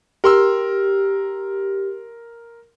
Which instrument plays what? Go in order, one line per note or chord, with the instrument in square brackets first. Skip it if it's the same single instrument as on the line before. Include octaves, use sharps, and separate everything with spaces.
[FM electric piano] G4 [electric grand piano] A#4 C6 E6